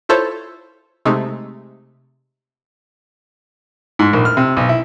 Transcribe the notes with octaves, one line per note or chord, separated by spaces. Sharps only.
E4 F4 A4 C5 C#5
C3 G#3 A3 D#4
G#2
A#1
F6
C3
B1
E4